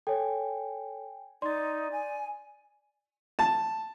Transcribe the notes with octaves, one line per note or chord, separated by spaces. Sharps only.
A4 C#5 G5 G#5
D#4 D5 C6 A6
G#5
A5